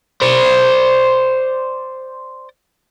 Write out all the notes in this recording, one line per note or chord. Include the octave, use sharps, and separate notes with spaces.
C5 D5